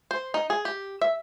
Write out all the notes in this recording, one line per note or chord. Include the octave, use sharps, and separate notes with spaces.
C5
D#4
G#4
G4
E5